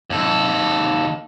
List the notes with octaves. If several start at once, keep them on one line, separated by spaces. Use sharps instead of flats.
D#2 A4